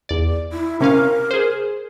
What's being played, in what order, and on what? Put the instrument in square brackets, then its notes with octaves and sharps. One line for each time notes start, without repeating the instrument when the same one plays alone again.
[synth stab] E2 D5
[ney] E4
[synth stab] C3 C#4 F5 [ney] A#4
[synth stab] G#4 C5